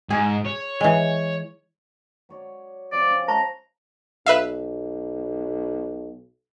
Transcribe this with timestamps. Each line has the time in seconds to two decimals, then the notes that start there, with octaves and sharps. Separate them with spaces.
0.10 G#2 G#4
0.46 C#5
0.81 E3 G#3
2.29 F#3 C#5 D5
2.92 C3 F3 D5
3.09 C#4
3.28 G#3 E4 C5 A5 A#5 C#6
4.26 B1 B4 E5 F5